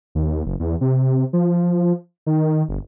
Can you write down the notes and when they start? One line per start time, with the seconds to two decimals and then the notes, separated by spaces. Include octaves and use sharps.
0.15 D#2
0.46 F#1
0.60 E2
0.81 C3
1.33 F3
2.26 D#3
2.69 G1